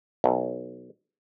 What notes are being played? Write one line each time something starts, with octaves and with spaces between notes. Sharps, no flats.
B1